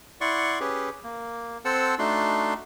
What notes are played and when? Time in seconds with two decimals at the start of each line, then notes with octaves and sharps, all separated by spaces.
0.21 E4 D5 F#5 C6 C#6
0.60 C#4 G4 G#4 B4
1.04 A#3
1.65 C4 A4 C5 F#5 A5 E6
1.99 A3 D4 D#4 F#4 C6